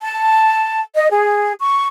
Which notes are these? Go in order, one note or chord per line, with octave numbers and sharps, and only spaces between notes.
A5
D#5
G#4
C#6